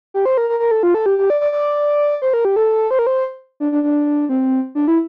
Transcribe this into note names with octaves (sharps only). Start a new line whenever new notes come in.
G4
C5
A#4
A#4
A#4
A4
F4
A4
G4
G4
D5
D5
D5
C5
A#4
G4
A4
C5
A#4
C5
D4
D4
D4
C4
D4
E4